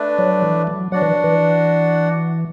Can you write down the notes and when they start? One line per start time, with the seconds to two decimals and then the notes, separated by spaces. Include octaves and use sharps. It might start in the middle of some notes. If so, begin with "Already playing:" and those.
Already playing: A3 D4 B4 D5
0.18 F#3
0.42 E3
0.67 F#3
0.92 F#3 D4 F#4 D5 F#5
1.02 E3
1.24 E3